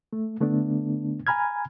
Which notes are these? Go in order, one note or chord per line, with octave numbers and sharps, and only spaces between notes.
A3
D3 A3 B3 D4
G#5 A#5 B5 F6 G#6